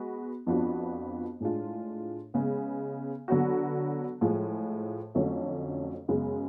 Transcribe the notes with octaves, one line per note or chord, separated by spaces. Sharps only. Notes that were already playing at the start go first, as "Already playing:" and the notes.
Already playing: G#3 B3 F#4
F2 F3 B3 D4 F#4
A2 G#3 D4 F4
C#3 G#3 B3
D3 F#3 B3 F#4
A2 F3 G#3
F2 D3 F#3 A3 C#4
F#2 C#3 G#3 B3